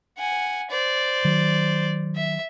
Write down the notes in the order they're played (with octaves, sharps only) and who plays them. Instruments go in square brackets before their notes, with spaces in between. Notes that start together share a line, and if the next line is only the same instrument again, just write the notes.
[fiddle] F#5 G#5
C5 D5
[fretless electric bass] D#3 F#3
[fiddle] E5